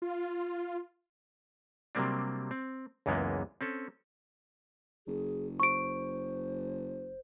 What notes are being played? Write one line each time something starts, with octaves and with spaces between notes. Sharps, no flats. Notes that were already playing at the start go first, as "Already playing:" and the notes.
F4
C3 F#3 G3 A#3 C4 D4
C4
C#2 F#2 E3 G#3 A#3 B3
C4 C#4 A4
F#1 G#4
C5 C#6 D7